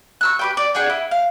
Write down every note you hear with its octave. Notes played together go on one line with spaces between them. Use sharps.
C#6 E6 F#6
G4 B4 G5
D5
D4 G#4 F#5 G5
E4
F5